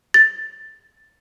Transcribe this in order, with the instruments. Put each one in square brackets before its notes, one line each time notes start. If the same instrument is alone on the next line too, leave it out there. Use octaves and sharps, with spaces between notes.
[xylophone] A6